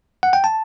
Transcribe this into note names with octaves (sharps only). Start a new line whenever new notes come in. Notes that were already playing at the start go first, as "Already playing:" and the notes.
F#5
G5
A5